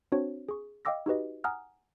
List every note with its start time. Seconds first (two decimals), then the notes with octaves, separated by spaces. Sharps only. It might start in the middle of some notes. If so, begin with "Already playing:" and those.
0.12 C4 D4 F#4 C5 C#5
0.49 G#4 C#6
0.85 D#5 F5 G5 D6 E6 A#6
1.06 D#4 F#4 G4 B4 D#5
1.44 F#5 G#5 A#5 D#6 F6 F#6